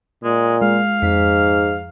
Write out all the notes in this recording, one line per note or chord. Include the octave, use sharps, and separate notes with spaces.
A#2 G#3
G#3 F5
F2 G#2 B6